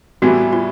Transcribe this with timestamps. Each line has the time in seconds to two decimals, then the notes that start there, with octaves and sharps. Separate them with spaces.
0.22 A2 E3 G3 B3 E4 F#4
0.53 F4